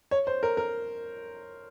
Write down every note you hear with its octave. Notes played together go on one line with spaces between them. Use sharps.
C#5
C5
A#4
A#4